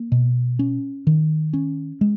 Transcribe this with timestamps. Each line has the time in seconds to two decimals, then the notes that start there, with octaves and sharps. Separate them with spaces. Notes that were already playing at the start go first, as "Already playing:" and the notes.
Already playing: A#3
0.12 B2
0.59 C#4
1.07 D#3
1.53 C#4
2.01 G#3